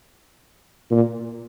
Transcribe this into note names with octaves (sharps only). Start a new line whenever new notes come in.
A#2